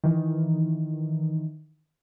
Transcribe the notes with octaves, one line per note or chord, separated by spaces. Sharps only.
D#3 E3